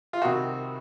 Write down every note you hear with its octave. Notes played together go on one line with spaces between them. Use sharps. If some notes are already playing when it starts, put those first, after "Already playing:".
F4
C2 C3 D#3 F#4